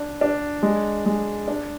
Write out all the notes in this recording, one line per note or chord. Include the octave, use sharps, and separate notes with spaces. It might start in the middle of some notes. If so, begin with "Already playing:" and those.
Already playing: D4
D4
G#3
G#3
D4